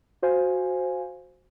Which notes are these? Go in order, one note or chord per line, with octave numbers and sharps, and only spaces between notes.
F#4 C5 F5 G#5